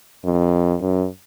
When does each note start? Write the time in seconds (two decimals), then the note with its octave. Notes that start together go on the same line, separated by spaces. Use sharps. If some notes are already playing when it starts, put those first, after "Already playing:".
0.25 F2
0.81 F#2